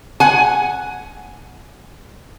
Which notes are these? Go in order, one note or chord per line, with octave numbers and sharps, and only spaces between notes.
F#5 G#5